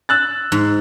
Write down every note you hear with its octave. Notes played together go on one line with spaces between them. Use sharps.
E6 F#6 A6
G#2